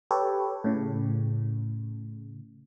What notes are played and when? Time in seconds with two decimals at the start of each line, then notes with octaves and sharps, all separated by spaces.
0.11 G4 A4 B4 C#5
0.64 A2 C#3